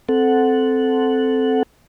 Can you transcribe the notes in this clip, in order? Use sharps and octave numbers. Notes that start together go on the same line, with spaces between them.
C4 A4 F#5